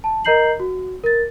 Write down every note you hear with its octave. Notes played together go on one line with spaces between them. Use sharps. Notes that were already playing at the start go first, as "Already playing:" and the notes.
A5
A#4 D#5 A#5 G6 C7 F#7
F#4
A#4 A6